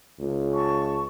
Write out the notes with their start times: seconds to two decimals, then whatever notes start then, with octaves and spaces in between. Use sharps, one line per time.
0.19 C#2
0.53 A5 C#6